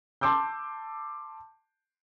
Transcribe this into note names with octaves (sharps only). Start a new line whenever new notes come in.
A5 C6 D6 E6 G6